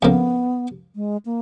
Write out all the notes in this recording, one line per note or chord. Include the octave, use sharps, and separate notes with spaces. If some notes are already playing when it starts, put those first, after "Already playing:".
F2 C#3 F3 A#3 B3
G#3
A#3